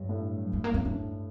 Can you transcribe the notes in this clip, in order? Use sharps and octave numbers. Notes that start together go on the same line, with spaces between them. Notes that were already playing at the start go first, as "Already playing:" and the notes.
Already playing: G2 F#3
A2
A3
A#3
C4
D4